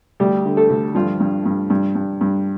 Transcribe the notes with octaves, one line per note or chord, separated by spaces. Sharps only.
D2 G3 G4
D3
A3 A4
D2
G2 F3 F4
G2
G2
G2
G2
G2